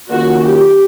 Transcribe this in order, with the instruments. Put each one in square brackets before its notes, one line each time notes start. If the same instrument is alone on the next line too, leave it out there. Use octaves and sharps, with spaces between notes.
[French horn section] D#3 F#3 A#3 C#4 F4 [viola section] F#4
[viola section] G4